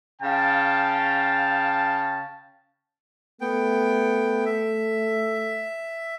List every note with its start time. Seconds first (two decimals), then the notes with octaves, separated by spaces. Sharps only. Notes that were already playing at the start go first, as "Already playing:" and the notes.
0.21 C#3 F5 G5 A5
3.41 A3 B3 G5
4.45 E5